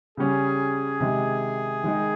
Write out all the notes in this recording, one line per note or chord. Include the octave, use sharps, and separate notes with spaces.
C#3 G3 C#4 G4 G#4
C3 D#3 G#3
D#3 G#3 D#4